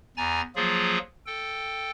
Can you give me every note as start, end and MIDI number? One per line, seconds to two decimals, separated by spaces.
0.17 0.41 40
0.17 0.41 80
0.17 0.41 82
0.17 0.41 93
0.56 0.98 53
0.56 0.98 54
0.56 0.98 58
0.56 0.98 65
0.56 0.98 68
1.26 1.91 69
1.26 1.91 79